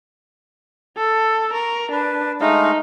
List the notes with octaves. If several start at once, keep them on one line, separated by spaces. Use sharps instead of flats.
A4
A#4 C#6
D4 B4
G#3 A3 D#4 F5